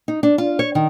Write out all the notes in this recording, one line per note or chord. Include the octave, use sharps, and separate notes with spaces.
D#4
D4
F4
C#5
D#3